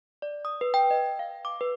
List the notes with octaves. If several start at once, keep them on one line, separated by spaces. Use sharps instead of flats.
D5
D#6
B4
G5
D#5
F5
D6
B4